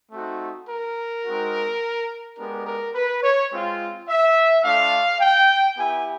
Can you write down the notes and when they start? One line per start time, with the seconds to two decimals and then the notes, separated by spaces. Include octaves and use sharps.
0.12 A3 C4 D#4 F#4
0.69 A#4
1.24 G#3 C4 D#4 F#4
2.37 G#3 B3 D4 G4 A#4
2.66 A#4
2.95 B4
3.23 C#5
3.51 G#3 C4 F4
4.08 E5
4.64 A3 D4 F4 F5
5.20 G5
5.78 B3 E4 G4 G#5